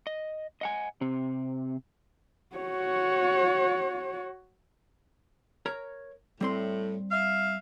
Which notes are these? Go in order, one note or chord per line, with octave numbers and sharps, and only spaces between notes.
D#5
D#5 F#5 G#5
C3 C4
F#4 C#5
A#4 C#5 A#5
A2 G3 C4 C6
E5 F5